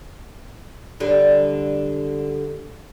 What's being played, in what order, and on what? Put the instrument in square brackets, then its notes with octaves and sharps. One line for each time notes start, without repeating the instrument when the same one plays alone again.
[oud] D3 G3